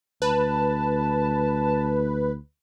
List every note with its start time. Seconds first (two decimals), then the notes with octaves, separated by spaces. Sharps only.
0.22 D2 B4 A5